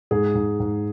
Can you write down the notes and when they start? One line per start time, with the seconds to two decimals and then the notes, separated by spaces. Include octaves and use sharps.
0.11 G#2 G#4
0.35 G#2
0.60 G#2